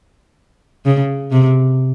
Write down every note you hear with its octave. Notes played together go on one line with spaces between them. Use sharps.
C#3
C3